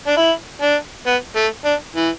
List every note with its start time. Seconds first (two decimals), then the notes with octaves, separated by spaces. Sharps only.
0.07 D4
0.17 E4
0.61 D4
1.06 B3
1.36 A3
1.65 D4
1.95 E3